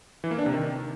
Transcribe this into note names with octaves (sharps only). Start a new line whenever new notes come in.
E3
A#3
D4
C3
D#3